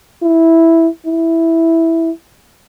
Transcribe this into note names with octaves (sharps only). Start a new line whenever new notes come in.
E4
E4